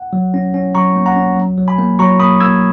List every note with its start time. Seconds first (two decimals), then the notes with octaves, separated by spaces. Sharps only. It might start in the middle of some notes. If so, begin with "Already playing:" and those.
Already playing: F#5
0.13 F#3
0.34 C#4
0.54 C#4
0.75 F#3 A#5 C#6
0.96 A#3
1.06 F#5 A#5
1.16 C#4
1.37 F#3
1.58 F#3
1.68 G#5 B5
1.79 A#3
1.99 F#3 A#5 C#6
2.20 A#3 B5 D#6
2.40 A#3 E6 G#6